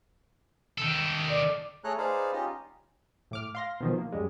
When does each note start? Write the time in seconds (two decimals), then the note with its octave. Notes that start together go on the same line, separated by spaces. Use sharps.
0.78 D#3 A4
1.29 D5
1.84 A3 G#4 A4 C#5 A#5 F#6
1.98 D#4 G#4 B4 C5 D5 F5
2.33 C#4 D#4 F4 G4 D#5
3.31 A2 D6 F6
3.55 F5 C6 A#6
3.81 B2 D#3 F3
3.98 A#3
4.12 F#2 G3 G#3